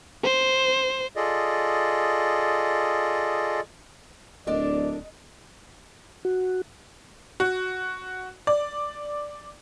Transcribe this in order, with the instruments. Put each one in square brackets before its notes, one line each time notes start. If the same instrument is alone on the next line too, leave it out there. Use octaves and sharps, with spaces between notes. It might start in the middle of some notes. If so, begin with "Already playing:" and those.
[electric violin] C5
[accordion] F4 G#4 A4 D5 D#5
[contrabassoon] D1 [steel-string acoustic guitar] D4 A4 A#4 [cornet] D5 [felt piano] D#5
[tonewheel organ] F#4
[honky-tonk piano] F#4
D5